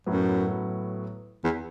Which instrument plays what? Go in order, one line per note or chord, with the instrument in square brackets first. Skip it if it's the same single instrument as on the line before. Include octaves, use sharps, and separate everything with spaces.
[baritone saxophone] F#2 [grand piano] A2 F#3 B3
[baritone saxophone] E2